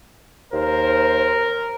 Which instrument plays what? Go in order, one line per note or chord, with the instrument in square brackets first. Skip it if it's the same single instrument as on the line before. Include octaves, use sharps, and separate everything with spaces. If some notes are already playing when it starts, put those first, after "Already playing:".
[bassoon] D#2 [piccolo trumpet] A#4 [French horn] C5